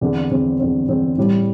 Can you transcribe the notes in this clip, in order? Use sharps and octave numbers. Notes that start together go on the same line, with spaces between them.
E2 D3 C4
E2 D3 C4
E2 D3 C4
E2 D3 C4
A2 E3 G3